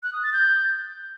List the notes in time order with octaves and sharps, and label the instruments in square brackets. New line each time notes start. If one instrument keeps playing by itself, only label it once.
[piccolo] F#6
D#6
A6
G6